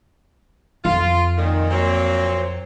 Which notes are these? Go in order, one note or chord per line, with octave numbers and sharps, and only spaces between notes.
F2 F4
A#2 D#3
A#2 F#3 C4